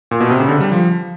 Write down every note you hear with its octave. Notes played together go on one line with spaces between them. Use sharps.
A#2
B2
C3
C#3
D3
G3
F3